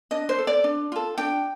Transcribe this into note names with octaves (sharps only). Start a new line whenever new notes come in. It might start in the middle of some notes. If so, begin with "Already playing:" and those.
D4 D#5
C5
A4
D5
D4
F4 A4
D4 G5